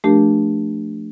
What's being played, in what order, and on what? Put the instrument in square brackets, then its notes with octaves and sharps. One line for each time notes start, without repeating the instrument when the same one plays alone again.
[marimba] F3 A3 D4 G4 A#4